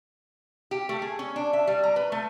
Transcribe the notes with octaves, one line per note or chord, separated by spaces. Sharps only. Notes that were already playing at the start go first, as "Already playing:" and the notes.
G4
A3
G#4
C#4
D4
E5
G3
A#5
B4
A3